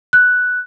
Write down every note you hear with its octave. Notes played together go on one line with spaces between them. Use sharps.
F#6